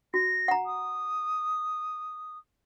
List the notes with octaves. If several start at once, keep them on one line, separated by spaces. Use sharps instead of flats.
F#4 A#6
F#5 A#5
D#6